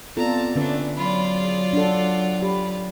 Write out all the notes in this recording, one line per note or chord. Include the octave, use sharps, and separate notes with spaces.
B3 C4 F4 A4 D5 A5 A#5
D3 A3 C#4 D4 B4
F#3 F4 D5 B5
G#4
D4 A4 F#5
G4 B5